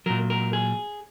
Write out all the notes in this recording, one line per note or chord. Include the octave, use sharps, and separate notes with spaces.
A#2 F#3 A#4
A#4
G#4